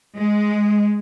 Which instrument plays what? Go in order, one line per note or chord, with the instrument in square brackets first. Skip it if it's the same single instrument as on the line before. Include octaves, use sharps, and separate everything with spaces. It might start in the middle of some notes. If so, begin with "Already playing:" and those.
[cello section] G#3